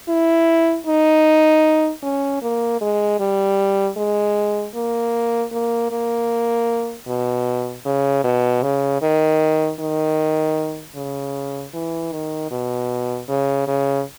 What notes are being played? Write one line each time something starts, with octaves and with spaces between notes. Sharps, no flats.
E4
D#4
C#4
A#3
G#3
G3
G#3
A#3
A#3
A#3
B2
C#3
B2
C#3
D#3
D#3
C#3
E3
D#3
B2
C#3
C#3